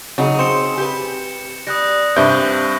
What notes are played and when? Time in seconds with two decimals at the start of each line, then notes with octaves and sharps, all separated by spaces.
0.18 C#3 F#3 D#4 G#4
0.39 C4 C#7 E7
0.78 G4 B4
1.67 G3 D#6 F#6 A#6
2.16 G2 C3 B4 G#5 G6 D7 G7